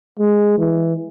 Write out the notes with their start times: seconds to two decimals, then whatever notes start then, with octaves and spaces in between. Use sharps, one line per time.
0.19 G#3
0.58 E3